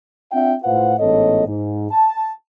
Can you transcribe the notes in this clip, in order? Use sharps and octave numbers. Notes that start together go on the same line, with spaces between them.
C4 D4 F4 E5 F#5 G5
A2 F4 B4 C5 F5 F#5
A1 G#2 B3 A4 C#5 D#5
G#2
A5